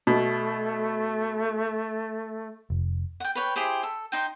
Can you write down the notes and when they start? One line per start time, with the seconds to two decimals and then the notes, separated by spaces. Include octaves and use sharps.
0.07 B2 A3
2.70 F1
3.20 F#5 G5
3.35 B4 C#5 G5
3.56 E4 G4 G#4 C5
3.83 A4
4.12 D#4 C5 G5